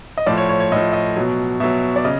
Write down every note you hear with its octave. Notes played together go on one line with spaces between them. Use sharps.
D#5
A2 F3 D5
C#5
C#5
C#5
A2 F3 D#5
D#5
B2 F#3
B2 F#3 E5
D5
C#3 D#5